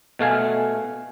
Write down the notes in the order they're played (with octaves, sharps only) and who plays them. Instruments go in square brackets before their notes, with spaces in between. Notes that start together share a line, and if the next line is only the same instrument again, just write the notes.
[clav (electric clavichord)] B2 A3 F5 G#5